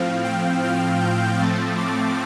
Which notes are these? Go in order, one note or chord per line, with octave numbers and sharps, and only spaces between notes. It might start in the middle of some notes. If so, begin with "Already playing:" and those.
Already playing: A2 F3 C4 F5
G5
F6
G6
A2 F3 A3 C4 A6
D6